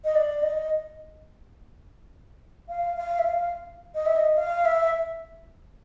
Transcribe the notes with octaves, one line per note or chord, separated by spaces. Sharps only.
D#5
D5
D#5
F5
F5
E5
F5
D#5
E5
D#5
F5
E5